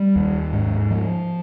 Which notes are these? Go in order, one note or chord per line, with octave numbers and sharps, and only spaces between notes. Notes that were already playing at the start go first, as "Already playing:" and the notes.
Already playing: G3
D#2
G#2
F3